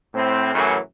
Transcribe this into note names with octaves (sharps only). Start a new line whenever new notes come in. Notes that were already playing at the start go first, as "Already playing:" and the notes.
A2 C4
F#2 A2 C#3 E3 F#3